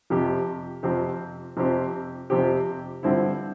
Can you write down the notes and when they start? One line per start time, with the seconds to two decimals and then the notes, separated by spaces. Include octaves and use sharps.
0.10 F2 C3 F3 C4 G4
0.83 F2 C3 F3 C4 G4
1.57 F2 C3 F3 C4 G4
2.30 F2 C3 F3 C4 G4
3.03 G2 D3 F3 C4 E4